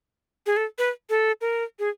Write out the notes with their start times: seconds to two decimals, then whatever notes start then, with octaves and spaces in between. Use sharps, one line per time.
0.46 G#4
0.57 A4
0.78 B4
1.10 A4
1.41 A#4
1.79 G#4